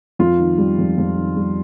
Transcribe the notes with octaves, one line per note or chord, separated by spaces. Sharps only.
F2 F4
D#3
G3
F2
F2
D#3
G3